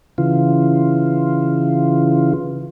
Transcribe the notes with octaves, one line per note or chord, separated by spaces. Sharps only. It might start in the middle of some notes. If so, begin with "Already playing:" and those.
C#3 E3 F4